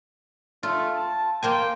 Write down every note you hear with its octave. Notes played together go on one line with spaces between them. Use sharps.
A3 F4
A5
A#3 C5 G5 G#5